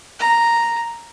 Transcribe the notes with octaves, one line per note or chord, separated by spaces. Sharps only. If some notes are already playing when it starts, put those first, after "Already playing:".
A#5